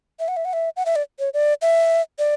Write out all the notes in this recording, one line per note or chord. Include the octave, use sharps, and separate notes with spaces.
E5
F#5
E5
F#5
E5
F#5
E5
D5
C#5
D5
E5
D5